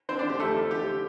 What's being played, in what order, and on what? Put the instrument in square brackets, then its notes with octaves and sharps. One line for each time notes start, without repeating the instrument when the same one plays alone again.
[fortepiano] D3 C4 C5
D4 D5
D3
G4
F2 A3 A4
F3
D3 G4
D3